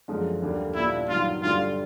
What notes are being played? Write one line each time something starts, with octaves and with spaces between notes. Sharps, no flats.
F#2 D3 F3 G#3
D#2 D3 G3 A#3
A#2 G3 B3 D4 E4 F4
G2 D#3 F#3 F4
G1 G2 D3 G3 F4